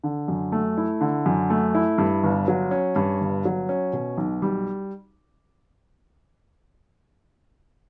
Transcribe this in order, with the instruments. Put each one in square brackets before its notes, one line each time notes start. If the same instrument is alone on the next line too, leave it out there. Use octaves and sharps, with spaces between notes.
[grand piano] D3
F#2
A3
E4
D3
F#2
A3
E4
G2
G1
F#3
C#4
G2
G1
F#3
C#4
B2
B1
G3